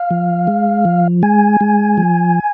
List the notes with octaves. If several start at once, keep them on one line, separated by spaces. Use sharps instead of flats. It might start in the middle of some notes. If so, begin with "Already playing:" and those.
Already playing: F5
F3
G#3
F3
G#3 G#5
G#3
F3